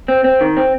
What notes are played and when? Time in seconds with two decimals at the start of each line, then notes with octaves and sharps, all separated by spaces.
0.08 C4
0.24 C4
0.41 D#3
0.57 C4